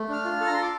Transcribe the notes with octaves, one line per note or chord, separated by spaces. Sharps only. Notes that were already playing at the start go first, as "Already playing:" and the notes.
Already playing: A3
D4 F6
F4
A4
A#5
A4 C6
D6